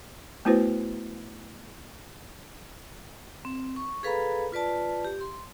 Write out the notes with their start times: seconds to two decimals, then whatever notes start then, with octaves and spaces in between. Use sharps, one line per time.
0.45 A3 B3 E4 F#4 B4 C5
3.45 C4
3.76 C#6
4.03 G#4 A4 B4 F5 A#5 B5
4.52 F4 B4 D5 A5
5.05 G4
5.21 C6